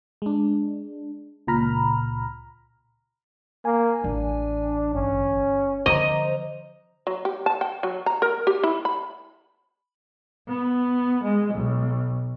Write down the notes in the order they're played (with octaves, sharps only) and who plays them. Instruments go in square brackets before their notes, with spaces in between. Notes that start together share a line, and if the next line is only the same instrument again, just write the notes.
[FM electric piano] G#3 D4
C#2 A#2 A#5 B5 F6
[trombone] A#3 [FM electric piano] G#5
[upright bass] A1 [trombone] D4
[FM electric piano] G1 [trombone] C#4
[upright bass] D3 F3 [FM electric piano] C5 A#5 [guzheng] D#5
[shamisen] F#3
G4
A5
G5
F#3
A#5
A#4
G4
E4
B5
[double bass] B3
G#3
B1